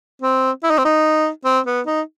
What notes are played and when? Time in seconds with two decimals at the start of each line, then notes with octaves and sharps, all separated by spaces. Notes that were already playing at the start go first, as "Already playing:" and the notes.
0.22 C4
0.64 E4
0.71 D#4
0.78 C4
0.85 D#4
1.45 C4
1.66 B3
1.86 D#4